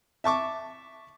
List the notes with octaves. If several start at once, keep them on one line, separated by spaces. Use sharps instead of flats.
E5 A5 C#6 D6